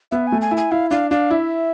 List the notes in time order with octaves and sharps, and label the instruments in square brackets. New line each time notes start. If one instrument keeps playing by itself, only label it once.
[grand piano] B3 [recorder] E5
[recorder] G#5
[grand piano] A3
[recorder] G#5
[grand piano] E4
[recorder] G#5
[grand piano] E4 [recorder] F5
[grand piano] D4 [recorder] F5
[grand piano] D4 [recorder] F5
[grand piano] E4 [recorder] E5